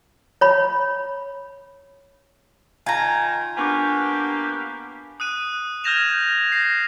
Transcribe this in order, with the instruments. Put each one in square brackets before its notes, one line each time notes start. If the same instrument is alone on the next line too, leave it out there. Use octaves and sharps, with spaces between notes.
[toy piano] C#5 B5
[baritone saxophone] D#3 [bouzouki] F4 A#5 [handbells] G#5 G#6
[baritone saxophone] A#3 [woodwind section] B3 D4 G4 [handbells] G#5 C#6 D6
[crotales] D#6 F#6 D#7
F6 G6 G#6 A#6 E7 F7
A#6 C7